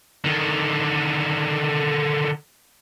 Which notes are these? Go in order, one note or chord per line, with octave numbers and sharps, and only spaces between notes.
D3 D#3